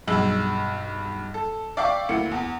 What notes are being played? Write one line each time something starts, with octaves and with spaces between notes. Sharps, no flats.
B1 G2 G#4 E6 F#7
A4
D5 E5 F5 G5 C#6 D6
D2 A#3 E4 C#7
E2